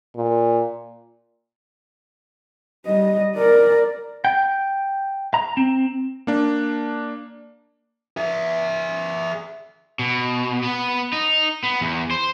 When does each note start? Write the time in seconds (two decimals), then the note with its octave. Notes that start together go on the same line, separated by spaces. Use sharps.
0.15 A#2
2.86 G3 D#5
3.36 A#4 D5
4.25 G5
5.34 A#5
5.57 C4
6.27 A#3 D4
8.17 G#4 E5
9.99 B2
10.63 B3
11.13 D#4
11.63 B3
11.81 E2
12.11 C5